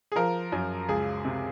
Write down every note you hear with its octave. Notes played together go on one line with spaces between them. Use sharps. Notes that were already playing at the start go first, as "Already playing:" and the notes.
G#4
F3 A#4
F#2
C#2 G#4
C3